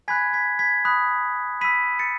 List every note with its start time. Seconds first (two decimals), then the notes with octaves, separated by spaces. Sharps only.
0.08 G#5 B5 F#6 G#6 B6
0.33 G#6 B6
0.59 G#6 B6
0.85 B5 D#6 F#6
1.61 B5 E6 B6 D#7
1.99 A6 C#7